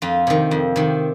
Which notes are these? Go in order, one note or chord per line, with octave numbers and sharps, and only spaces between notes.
F2 F4
C3 D#3
F2
C3 D#3